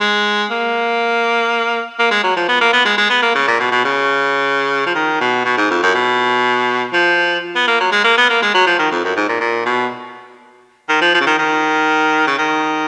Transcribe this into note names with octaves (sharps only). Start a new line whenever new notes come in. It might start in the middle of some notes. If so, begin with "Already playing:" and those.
G#3
A#3
A#3
G#3
F#3
F3
B3
A#3
B3
G#3
G#3
B3
A#3
C#3
A#2
B2
B2
C#3
F3
D#3
B2
B2
G#2
F2
F#2
B2
F3
B3
A#3
F#3
G#3
A#3
B3
A#3
G#3
F#3
F3
D#3
F2
F#2
G#2
A#2
A#2
B2
D#3
F3
F3
C#3
D#3
D#3
C#3
D#3